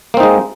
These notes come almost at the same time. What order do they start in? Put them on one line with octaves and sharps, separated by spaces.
A#3 C4 D#4 G#3